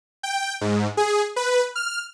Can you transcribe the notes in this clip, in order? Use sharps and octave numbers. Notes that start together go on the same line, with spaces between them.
G5
G#2
G#4
B4
F6